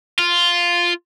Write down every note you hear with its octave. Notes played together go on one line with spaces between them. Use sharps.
F4